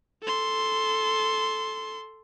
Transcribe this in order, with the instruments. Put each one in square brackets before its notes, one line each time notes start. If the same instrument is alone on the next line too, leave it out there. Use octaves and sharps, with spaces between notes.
[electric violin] A4 C6